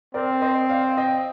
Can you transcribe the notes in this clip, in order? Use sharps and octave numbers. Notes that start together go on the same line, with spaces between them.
C4 A#4 D5
C5 D#5
D5 F5
D#5 G5